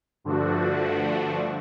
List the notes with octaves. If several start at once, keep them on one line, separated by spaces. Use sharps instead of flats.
G2 D3 F3 A3 D4 F#4